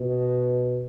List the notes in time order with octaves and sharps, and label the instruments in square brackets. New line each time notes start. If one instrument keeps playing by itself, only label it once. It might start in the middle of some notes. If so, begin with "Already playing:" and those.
Already playing: [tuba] B2